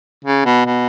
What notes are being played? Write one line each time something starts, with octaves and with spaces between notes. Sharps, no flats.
C#3
B2
B2